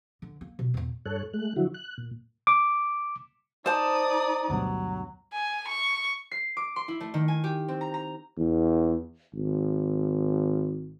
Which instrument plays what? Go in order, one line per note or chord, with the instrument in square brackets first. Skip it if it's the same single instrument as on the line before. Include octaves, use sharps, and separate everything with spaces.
[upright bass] D3
A#3
B2
E2 A#2
[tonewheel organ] G2 A4 C#5 F#6
G#3 A3 F#6
D3 F3 F#3 E4 F#4
F#6
A#2
[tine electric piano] D6
[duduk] D#4 [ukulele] C5 A5 [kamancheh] D5 D#6
[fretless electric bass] D2 G2 B2 [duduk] F#3
[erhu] G#5
C#6
[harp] C7
D6
C6
E4
A3
D#3
G#5
G4
C4
A#5
A#5
[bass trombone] E2
G#1